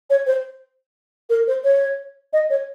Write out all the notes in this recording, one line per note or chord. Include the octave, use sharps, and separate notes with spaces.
C#5
C5
A#4
C5
C#5
D#5
C#5